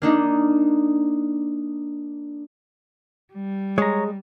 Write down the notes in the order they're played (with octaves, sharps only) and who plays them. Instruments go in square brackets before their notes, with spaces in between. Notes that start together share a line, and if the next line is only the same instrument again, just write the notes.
[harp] A#3 D4 D#4
[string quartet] G3
[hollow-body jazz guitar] G#3 [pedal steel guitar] C#5 A#5